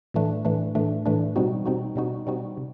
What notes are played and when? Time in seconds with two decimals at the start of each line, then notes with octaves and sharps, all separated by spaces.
0.14 A2 E3 A3 D4
0.45 A2 E3 A3 D4
0.75 A2 E3 A3 D4
1.06 A2 E3 A3 D4
1.36 B2 G3 C4 D#4 F#4
1.66 B2 G3 C4 D#4 F#4
1.96 B2 G3 C4 D#4 F#4
2.27 B2 G3 C4 D#4 F#4
2.57 C3